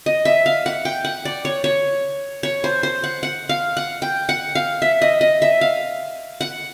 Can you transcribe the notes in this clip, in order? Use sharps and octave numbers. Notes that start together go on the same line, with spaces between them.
D#5
E5
F5
F#5
G5
F#5
D5
C#5
C#5
C#5
C5
C5
F#5
F#5
F5
F#5
G5
F#5
F5
E5
D#5
D#5
E5
F5
F#5